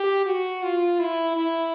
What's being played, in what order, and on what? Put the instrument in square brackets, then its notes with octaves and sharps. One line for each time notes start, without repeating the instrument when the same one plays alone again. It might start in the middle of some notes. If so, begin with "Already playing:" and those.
Already playing: [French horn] G4
F#4
F4
E4
E4